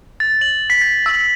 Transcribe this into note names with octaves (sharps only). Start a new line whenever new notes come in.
A6
F#7
B6
A6
E6